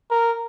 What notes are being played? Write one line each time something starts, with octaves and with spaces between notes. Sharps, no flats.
A#4